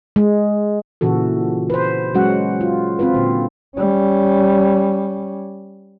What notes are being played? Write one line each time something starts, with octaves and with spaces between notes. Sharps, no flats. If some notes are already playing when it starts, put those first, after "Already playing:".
G#3
A#2 C#3 E3 F#4 A4
B4 C5
F#3 G#3 C#4 F#4 F#5
F4
C4 F4 B4
A#2 D3
G3 C#4